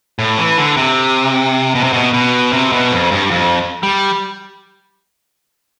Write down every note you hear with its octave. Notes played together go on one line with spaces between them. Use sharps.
A2
E3
D3
C3
B2
C3
B2
B2
C3
B2
F2
G2
F2
G3